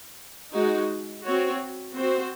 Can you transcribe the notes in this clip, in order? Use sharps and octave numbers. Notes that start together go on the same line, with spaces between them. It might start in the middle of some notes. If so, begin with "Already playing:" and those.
G#3 D#4 F#4
C4 F#4 C#5
C4 F#4 C5